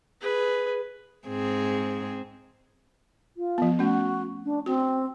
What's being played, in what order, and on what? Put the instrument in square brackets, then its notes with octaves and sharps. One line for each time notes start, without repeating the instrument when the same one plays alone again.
[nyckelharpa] G#4 B4
[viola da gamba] G#2 C4 G#4
[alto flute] F4
[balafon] F3 B3
[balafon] A3 C#4 [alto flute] F#4
[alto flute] D4
[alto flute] C4 [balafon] F#4